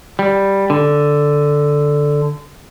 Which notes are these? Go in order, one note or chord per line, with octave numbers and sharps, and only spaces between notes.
G3
D3